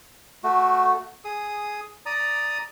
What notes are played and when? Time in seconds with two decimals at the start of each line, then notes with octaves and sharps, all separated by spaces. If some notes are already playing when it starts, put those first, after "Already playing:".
0.44 A3 F#4
1.25 G#4 D#6
2.06 D5 A#5 D#6